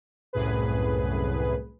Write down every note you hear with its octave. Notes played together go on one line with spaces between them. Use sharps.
C2 F#2 A2 G#4 B4